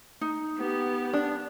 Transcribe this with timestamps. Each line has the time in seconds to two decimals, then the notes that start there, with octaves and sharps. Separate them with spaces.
0.21 D#4
0.57 B3 G4
1.14 D4